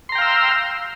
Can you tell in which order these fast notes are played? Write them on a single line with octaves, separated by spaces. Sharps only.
C6 A#5 G5 F5 E6